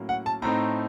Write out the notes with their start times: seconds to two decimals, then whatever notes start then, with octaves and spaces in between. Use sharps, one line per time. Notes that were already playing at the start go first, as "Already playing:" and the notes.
Already playing: A2 F#3 A#3 C#4
0.09 F#5
0.26 A5
0.42 A2 A3 C4 D#4 A#5